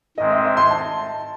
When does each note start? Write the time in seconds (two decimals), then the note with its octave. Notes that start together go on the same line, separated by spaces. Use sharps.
0.18 G#2 D#3 G#3 C4 D#5
0.30 E5
0.45 E5
0.57 C6
0.70 A5